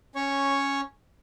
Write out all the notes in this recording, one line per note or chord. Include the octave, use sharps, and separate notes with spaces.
C#4 C#5 C#6